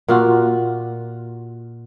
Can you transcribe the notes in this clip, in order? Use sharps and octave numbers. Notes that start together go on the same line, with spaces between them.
A#2 F4 F#4